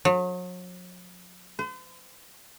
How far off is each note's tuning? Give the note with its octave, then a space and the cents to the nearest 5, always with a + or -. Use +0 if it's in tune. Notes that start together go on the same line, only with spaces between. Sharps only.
F#3 -40
C5 -45